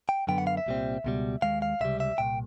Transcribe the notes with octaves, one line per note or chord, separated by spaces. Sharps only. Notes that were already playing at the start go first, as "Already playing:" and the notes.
G5
F#2 D3 F#3 B3 G5
F#5
F5
E5
C2 A#2 G3 C4
C#2 B2 G3
D#2 D#3 G#3 F5
F5
C#2 C3 G3 E5
E5
C2 A#2 G5